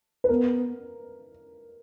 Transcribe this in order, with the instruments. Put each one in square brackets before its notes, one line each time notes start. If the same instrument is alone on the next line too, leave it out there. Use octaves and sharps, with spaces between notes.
[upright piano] B4
[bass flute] B3 [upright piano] A#4